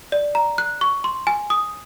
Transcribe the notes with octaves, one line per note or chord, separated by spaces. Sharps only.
D5
A#5
F#6
C#6
C6
G#5
D#6